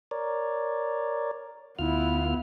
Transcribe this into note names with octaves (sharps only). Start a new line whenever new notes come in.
A#4 C#5 D5
D2 B3 E4 F4 F6